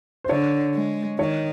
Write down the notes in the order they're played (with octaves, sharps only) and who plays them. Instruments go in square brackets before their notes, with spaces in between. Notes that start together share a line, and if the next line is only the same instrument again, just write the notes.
[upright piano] C5
[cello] D3 [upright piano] C#5
[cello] G#3
[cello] D#3 [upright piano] C#5